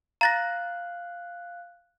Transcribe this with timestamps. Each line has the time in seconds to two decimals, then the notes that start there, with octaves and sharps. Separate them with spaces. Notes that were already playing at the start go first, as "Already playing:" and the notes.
0.21 F5 A#5 F#6 A6 A#6